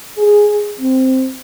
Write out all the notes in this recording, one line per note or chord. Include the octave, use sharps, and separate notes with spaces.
G#4
C4